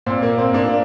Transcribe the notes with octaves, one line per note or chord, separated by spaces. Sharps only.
A#2 C4
A#3
C4
A#2 A#3 D4